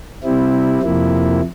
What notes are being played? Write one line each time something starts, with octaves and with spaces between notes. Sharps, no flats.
C3 G3 C4 E4
F2 C3 F3 A#3 E4